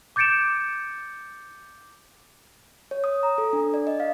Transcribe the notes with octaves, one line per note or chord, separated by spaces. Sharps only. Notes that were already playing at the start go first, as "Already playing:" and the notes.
D6 G6 A6 C#7 D7 E7
C#5
D#6
A#5
A4
D4
D5
D#5
F5